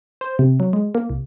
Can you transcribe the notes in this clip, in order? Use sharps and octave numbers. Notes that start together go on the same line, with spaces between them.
C5
C3
F#3
G#3
A#3
C2